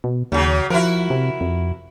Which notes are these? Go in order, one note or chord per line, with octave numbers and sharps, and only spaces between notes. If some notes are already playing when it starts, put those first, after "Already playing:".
B2
D#2 C#3 F#3
F3 E4 F#4 A#4
C3
F2